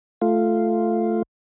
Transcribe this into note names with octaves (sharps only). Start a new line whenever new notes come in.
A3 F4